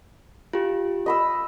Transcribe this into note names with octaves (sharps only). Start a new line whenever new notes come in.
F4 G4
D#5 B5 E6